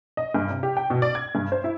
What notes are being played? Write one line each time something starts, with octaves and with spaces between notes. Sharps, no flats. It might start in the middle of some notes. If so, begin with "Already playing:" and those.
D#5
G2
C3
G4
G5
B2
D5
G#6
G2
C5
E4